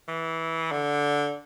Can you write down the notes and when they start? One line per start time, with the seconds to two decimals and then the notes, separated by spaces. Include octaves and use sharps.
0.08 E3
0.72 D3